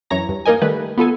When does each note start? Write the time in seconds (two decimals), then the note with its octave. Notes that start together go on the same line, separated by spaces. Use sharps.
0.10 F#2 E3 C#5 A#5 A#6
0.29 G2
0.45 A#3 D#4 A#4 D#5 G#5
0.62 D#3 G3 A3 B4
0.97 B3 F4 A4 G#5